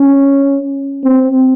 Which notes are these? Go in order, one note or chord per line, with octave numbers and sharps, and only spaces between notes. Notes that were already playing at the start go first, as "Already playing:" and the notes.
Already playing: C#4
C4